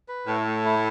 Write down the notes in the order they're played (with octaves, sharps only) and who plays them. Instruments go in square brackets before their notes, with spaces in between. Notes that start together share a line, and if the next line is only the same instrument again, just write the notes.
[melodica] B4
[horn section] A2 [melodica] A3
[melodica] A3
E4